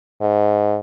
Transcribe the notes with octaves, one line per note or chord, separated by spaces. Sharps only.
G#2